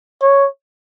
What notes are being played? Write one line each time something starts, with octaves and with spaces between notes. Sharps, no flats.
C#5